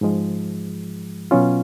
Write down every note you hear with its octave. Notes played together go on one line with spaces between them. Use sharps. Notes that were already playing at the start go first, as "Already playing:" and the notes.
G#2 F3 G#3
B2 F#3 C#4 F4